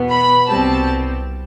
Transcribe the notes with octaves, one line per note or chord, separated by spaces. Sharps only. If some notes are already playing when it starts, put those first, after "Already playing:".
Already playing: E2 B2 B3
B5
C2 B2 G3 C4 A5